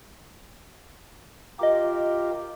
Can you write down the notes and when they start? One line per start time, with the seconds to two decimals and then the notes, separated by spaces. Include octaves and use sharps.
1.59 F4 G4 A#4 D#5 D6